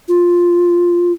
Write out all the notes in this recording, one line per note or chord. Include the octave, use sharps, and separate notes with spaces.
F4